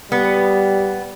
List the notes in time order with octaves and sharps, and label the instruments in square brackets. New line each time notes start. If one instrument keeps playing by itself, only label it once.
[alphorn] G3 [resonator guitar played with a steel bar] B3